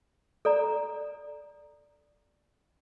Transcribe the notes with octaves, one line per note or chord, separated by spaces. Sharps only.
A4 D5 A#5